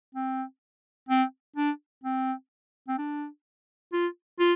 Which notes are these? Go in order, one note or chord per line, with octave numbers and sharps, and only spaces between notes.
C4
C4
D4
C4
C4
D4
F4
F4